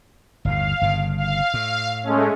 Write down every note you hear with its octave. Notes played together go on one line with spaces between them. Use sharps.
G1 D#2 A2 F5
G1 G2 C#3
F5
A2
G#3 A3 C#4